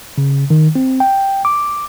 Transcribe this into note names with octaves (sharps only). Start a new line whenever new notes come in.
C#3
D#3
C4
G5
D6